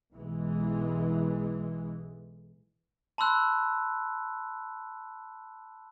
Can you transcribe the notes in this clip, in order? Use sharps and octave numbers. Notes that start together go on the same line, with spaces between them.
B1 E3 G#3
A5 B5 C6 E6 F#6